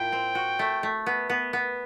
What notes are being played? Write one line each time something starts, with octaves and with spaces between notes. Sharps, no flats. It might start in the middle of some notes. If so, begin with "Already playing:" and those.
Already playing: A#2 E4 G5
C4
F#4
A3
A3
B3
B3
B3